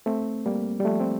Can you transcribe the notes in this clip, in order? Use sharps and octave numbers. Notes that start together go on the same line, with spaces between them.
A3 C4
G3 A#3
G3
F3 A3
C4